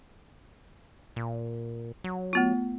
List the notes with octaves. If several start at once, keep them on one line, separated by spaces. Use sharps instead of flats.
A#2
F#3
A3 B3 F4